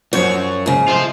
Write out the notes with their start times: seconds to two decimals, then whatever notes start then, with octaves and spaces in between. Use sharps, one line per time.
0.13 C2 F#2 F3 F#3 C5 C#5
0.66 G#2 C#3 F5
0.88 C3 G#3 A3 F4 C5